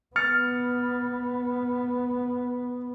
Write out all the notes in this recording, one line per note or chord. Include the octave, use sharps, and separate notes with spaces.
B3 F6 A6 C#7